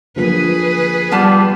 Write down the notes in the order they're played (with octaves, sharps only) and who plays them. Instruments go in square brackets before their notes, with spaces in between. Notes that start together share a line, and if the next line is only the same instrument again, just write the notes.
[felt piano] D3 F3 A#3 [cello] G#4 B4
[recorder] G3 [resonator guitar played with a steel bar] B3 F4 A5